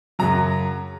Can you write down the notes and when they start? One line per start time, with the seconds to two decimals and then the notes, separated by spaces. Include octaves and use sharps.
0.19 F#2 C#3 F#3 A#5